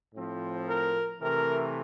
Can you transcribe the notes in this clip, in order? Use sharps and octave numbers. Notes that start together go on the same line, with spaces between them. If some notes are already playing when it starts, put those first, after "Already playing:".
A2 F3 C4
A#4
C3 E3 A3 C4 A#4